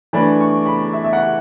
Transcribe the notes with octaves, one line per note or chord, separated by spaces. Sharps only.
E3 A3 D4 B5
C#6
B5
E5
E5
F#5